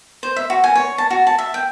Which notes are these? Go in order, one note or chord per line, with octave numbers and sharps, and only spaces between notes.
C5
E5
F#4
G#5
C#5
A5
F#4
A5
E5
G5